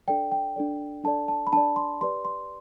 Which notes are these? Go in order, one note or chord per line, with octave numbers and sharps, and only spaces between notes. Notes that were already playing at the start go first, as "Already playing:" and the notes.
D4 A4 D5 G5
G5
D4 A4 D5
D4 A4 D5 A5
A5
B5
D4 A4 D5 A5
C6
G4 B4 D5 C6
C6